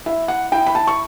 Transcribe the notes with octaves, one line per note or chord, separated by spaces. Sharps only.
E4 E5
F#5
E4 G5
B5
A5
C#6